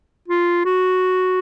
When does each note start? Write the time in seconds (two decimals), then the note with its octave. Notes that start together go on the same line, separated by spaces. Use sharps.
0.28 F4
0.65 F#4